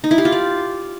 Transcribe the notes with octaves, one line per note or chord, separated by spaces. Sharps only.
D#4
E4
G4
F4
D5